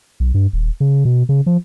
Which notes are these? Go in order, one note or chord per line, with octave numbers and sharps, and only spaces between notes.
B1
G2
D#1
C#3
B2
C#3
F3